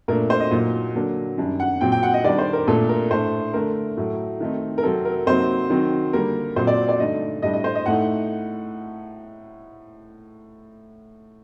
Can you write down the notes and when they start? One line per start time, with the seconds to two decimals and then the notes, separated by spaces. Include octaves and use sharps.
0.08 A#2 A3 D4 A#4
0.30 C5
0.40 D#5
0.51 A#2 F#3 A#3 D#4
0.95 D3 F#3 A#3 D4
1.38 F#2 D#3 G3 D4
1.60 F#5
1.81 A#2 F#3 C4 G5
1.92 G5
2.03 F#5
2.14 D#5
2.24 D#3 G3 D4 D5
2.39 C5
2.53 A#4
2.68 A#2 A3 D4 A4
2.89 A#4
3.11 A2 A3 D4 C5
3.54 D3 A3 D4 A#4
3.97 A2 F#3 A3
4.40 D#3 A3 C4 D#4
4.78 A#4
4.83 C3 F#3 C4 A4
5.05 A#4
5.27 C3 F#3 A#3 D#4 C5
5.70 D#3 F#3 C4 D#4
6.13 D3 G3 A#3 A#4
6.56 A#2 F#3 C4 C5
6.67 D5
6.89 D5
7.00 G2 D3 A3 D#4 D#5
7.42 A2 G3 D4 D#5
7.53 D#5
7.64 C5
7.75 D#5
7.86 A2 A3 D#4 F#5